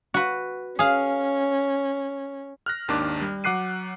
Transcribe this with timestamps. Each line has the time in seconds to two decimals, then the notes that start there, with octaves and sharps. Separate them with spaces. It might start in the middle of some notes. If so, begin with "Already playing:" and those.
0.14 F#4 B4
0.79 C#4 G#4 F5
2.66 F6 F#6 A#6
2.88 G#1 D#2 D#3 D4 D6
3.21 G3
3.44 F#3 F#5 D6 F#6 C7 D#7